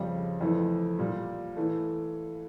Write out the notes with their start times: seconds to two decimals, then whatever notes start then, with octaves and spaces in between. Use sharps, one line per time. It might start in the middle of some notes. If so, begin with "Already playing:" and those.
Already playing: F2 C#3 G3 G5
0.41 F2 E3 A3
0.99 A#2 G3
1.56 E3 A3